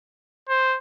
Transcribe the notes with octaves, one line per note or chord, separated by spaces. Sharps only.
C5